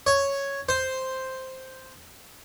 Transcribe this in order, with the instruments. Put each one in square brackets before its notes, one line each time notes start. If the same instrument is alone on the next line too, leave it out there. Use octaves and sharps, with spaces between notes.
[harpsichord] C#5
C5